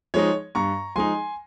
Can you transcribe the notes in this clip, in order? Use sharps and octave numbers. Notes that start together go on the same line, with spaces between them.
F3 G#3 D#4 C#5
G2 A#5 C#6
F3 G#3 D#4 G#5 C6